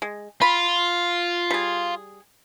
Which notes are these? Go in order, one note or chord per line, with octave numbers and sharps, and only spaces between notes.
G#3
F4 B5
G3 G#4